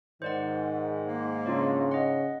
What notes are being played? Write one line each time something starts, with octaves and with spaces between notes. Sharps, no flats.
G#2 D#3 C5 D5 F#5
A#3
C#3 D4 F4 D5
D#5 F#5